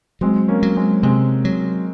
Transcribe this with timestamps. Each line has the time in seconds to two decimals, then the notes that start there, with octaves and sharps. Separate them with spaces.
0.21 F#3 G#3 C4
0.48 A#3 C#4
0.63 F#3
0.76 G#3 C4
1.03 C3 G#3 C4
1.45 F#3